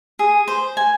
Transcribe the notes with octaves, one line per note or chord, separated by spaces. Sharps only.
G#4
C5
G#5